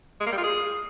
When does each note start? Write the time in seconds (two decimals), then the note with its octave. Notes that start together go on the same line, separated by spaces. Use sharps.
0.20 G#3
0.26 A#3
0.32 G3
0.38 F4
0.43 G#4